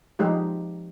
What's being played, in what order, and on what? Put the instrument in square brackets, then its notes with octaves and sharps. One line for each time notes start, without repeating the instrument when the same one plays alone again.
[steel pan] F3 G#3 D#4 G4